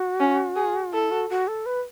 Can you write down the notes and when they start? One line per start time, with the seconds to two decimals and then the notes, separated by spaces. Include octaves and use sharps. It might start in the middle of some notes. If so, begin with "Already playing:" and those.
Already playing: F#4
0.20 C#4
0.56 G#4
0.93 E4 A4
1.11 F#4
1.30 F#4
1.48 A4
1.66 B4